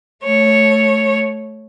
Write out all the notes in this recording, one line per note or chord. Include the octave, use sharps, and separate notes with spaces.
A3 C#5